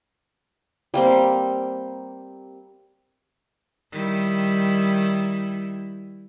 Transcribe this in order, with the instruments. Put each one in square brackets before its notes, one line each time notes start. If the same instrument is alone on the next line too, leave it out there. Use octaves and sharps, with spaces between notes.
[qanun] G3 A#3 C4
[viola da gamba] D#3 G3 E4